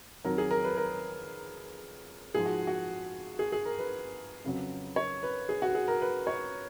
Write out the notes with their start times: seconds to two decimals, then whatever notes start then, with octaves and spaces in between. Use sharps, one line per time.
0.24 F2 D#3 F#3 A#4
0.38 G#4
0.51 A#4
0.64 B4
0.77 A#4
2.34 G#2 F3 G#4
2.45 F#4
2.67 F#4
3.39 G#4
3.52 G#4
3.65 A#4
3.79 B4
4.44 F2 C#3 F#3
4.96 C#5
5.23 B4
5.49 G#4
5.62 F#4
5.75 G#4
5.88 A#4
6.01 B4
6.27 C#5